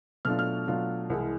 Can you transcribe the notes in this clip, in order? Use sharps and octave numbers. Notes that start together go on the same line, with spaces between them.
B2 F#3 A3 D4 F4 F6
F6
B2 F#3 A3 D4 F4
C2 C3 E3 G#3